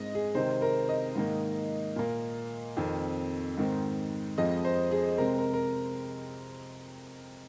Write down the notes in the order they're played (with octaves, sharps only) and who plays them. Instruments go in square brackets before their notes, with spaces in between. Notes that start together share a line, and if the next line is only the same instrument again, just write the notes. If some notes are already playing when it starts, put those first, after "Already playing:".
Already playing: [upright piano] G#2 G#3 C4 D#5
G#4
C3 D#3 G#3 C4 C5
A#4
D#5
G#2 D#3 A#3
A#2 A#3
F2 D#3 C4
G#2 D#3 C4
F2 F3 G#3 D#5
C5
G#4
C3 G#3 C4 A#4
A#4
A#4